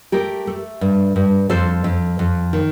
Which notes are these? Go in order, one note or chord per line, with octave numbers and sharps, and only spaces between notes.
A3 G4 A#4
A3
G2
G2
F2 A4 C5
F2
F2
D#3